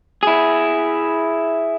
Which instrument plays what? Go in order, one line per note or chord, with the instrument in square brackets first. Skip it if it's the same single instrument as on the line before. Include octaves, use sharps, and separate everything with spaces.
[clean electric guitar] E4 G#4